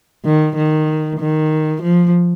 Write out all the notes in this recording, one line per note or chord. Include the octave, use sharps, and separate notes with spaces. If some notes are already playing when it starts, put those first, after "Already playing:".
D#3
D#3
D#3
F3